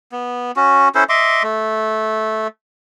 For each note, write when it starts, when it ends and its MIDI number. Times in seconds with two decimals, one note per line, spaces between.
0.12 0.52 59
0.56 0.89 61
0.56 0.89 66
0.95 1.04 61
0.95 1.04 64
0.95 1.04 69
0.95 1.04 72
1.09 1.43 75
1.09 1.43 76
1.09 1.43 84
1.09 1.43 86
1.43 2.47 57